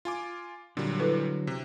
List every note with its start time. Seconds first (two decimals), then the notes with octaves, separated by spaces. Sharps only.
0.05 F4 G#5 D6
0.77 A#2 D3 F#3 G3
1.00 E4 A4 B4
1.47 C3